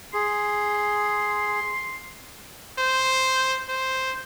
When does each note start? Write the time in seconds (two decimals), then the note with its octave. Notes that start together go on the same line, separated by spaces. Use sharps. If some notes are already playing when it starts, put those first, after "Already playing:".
0.14 G#4 C6
2.79 C5
3.69 C5